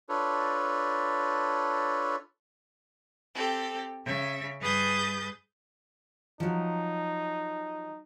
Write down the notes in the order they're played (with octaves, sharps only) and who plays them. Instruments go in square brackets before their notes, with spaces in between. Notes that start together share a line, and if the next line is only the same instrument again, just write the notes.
[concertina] D4 F4 A4 B4 C#5
[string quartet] C4 G4 A4
C#3 E5
G2 G#4 B4 D#6 G6 A6
[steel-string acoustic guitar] F3 F#3 [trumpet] D#4